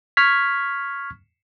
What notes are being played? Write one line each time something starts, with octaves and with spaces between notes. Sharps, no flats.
C#6 F6 G#6 B6